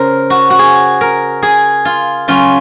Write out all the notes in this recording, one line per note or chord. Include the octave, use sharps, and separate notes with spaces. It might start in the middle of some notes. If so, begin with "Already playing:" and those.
Already playing: C#3 A#4 C5
F#4
F#4
G#4
A#4
G#4
F4
C#3 F#3 C#4 F4